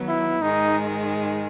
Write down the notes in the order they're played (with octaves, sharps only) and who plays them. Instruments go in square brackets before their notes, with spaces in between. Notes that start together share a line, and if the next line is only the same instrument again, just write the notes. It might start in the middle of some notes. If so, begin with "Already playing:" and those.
Already playing: [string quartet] D#3 F#3 B3
[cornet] E4
[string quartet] G#2 D#3 G#3 [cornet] D#4